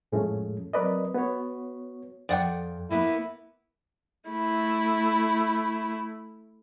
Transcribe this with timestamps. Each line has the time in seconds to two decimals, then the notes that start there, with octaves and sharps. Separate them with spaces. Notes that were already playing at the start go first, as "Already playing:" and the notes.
0.12 F2 A2 F3 G#3 A3 C#4
0.73 F#3 C4 A#4 B4 D5 D#5
1.14 B3 F#4 C#5
2.29 F2 D5 F#5 G5
2.90 A#3 B3 E4 B4
4.30 A3 E4